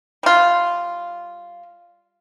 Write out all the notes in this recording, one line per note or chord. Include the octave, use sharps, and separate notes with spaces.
G3 F4